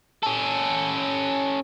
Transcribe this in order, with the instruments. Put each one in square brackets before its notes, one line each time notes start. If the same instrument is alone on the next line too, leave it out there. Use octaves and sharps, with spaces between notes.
[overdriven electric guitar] C#4 A4